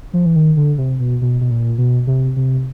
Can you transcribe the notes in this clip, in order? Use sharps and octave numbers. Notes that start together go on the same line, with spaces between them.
F3
E3
D#3
D3
C3
B2
B2
B2
A#2
B2
C3
C3